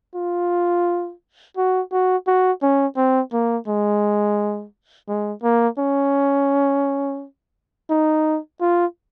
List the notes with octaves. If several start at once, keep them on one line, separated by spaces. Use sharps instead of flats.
F4
F#4
F#4
F#4
C#4
C4
A#3
G#3
G#3
A#3
C#4
D#4
F4